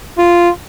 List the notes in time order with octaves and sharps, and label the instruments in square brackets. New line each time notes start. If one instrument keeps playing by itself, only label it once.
[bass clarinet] F4